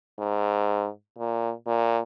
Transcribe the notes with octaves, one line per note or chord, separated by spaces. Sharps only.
G#2
A#2
A#2